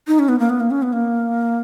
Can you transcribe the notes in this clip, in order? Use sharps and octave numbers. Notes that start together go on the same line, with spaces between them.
D#4
C#4
B3
A#3
B3
A#3
C#4
B3
A#3